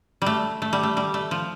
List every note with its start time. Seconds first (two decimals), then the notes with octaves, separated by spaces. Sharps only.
0.22 G3 A3
0.62 A3
0.73 G3
0.83 A3
0.97 G3
1.14 A3
1.31 F3